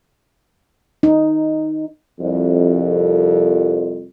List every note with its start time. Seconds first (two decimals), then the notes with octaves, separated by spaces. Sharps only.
1.03 D#4
2.20 C2 F2